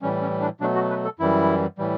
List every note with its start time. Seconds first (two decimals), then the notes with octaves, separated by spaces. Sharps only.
0.02 A2 E3 G3 C#4
0.21 C#4
0.41 D4
0.60 B2 F#3 A3 D4
0.75 F#4
0.90 B4
1.05 A4
1.19 F#2 E3 G3 E4
1.78 A2 E3 G3